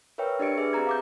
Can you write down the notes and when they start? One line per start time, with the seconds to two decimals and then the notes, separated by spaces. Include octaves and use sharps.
0.18 A#4 B4 C#5 E5 G5
0.39 D4 G4 D5 C#7 D7
0.58 G#4 B4 E5
0.73 C4 G4 G#4 A#5 G#6
0.87 F5 D6 G6